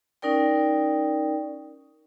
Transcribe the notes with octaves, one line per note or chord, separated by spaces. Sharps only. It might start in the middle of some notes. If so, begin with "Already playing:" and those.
C#4 D#4 A#4 D5 G5